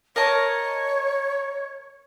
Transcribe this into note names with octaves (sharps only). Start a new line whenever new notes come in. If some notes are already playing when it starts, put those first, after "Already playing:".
A#4 C#5 D#5 A5